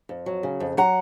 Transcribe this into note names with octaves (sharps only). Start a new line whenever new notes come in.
F2
F#3
C#3
F2
F#3 F#5 A#5